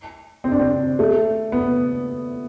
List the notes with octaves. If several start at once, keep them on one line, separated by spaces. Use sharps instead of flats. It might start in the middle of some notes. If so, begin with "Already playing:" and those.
C4
D4
C4
A3
B3